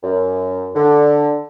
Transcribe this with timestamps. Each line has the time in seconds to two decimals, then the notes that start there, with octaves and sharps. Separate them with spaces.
0.03 F#2
0.75 D3